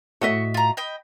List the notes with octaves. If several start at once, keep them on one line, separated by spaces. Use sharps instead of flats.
A2 F#4 D#5 E5 C#6
F4 A#5
D#5 G5 B5